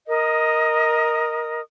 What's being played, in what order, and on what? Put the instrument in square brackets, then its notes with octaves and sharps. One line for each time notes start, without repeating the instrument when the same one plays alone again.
[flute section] A#4 D#5 D#6